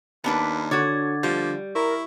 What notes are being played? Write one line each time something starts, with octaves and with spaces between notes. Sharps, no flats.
D#2 B3 D4 B4
D3 F#4 C#5 D6 G#6 A6
F3 G3
E4 A#4 C#6